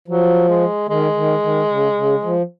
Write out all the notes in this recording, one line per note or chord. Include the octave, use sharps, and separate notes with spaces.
F3 F#3
G#3
D#3 G#3
D#3
D#3
C#3
C#3
F3